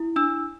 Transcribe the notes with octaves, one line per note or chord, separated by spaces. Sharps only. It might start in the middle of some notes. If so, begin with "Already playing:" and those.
Already playing: E4
D4 E6